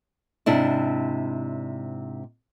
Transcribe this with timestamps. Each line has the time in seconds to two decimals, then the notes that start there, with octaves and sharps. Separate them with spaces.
0.46 G#2 C3 D4 E4